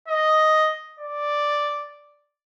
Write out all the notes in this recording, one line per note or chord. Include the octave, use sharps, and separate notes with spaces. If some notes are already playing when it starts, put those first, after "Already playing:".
D#5
D5